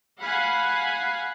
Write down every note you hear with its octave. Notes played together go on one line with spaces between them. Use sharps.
F5 F#5 G#5 B5